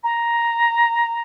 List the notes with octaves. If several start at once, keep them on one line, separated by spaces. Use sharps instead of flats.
A#5